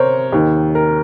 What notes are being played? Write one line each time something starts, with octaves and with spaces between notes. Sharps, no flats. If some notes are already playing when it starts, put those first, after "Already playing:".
Already playing: C3 A#4 C5 C#5
D#2 D#3
A#4